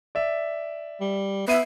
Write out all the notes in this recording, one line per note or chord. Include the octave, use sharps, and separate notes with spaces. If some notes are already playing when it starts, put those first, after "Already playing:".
D5 E5
G3
B3 E5 C7 D#7